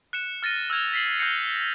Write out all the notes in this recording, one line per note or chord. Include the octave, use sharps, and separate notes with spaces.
F#6 C#7 E7
F6 A6 A#6 D#7
E6 F6 G#6 F7
B6 C7 F#7
F6 G6 A#6 C7 C#7 F7